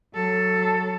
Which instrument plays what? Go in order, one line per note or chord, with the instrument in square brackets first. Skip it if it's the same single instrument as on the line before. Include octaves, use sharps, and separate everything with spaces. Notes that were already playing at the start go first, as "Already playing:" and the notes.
[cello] F#3 A4